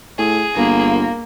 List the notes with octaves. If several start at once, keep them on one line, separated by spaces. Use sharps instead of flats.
A2 G#4
G1 A#3